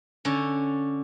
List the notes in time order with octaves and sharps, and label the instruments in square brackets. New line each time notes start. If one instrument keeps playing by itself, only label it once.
[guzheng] D3 C#4